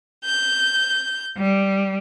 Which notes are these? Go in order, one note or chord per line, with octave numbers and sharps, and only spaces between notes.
G6
G3